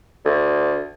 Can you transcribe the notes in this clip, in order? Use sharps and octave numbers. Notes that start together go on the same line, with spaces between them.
D2